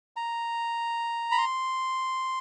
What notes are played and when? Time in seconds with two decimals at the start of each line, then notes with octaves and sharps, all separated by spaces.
0.16 A#5
1.31 B5
1.38 C6